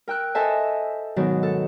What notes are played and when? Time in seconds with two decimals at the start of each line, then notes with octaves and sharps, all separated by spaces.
0.08 A#4 G5 E6 F#6
0.35 A4 C5 D#5 E5 G#5 A5
1.16 G#2 B2 D#3 F#3
1.43 A4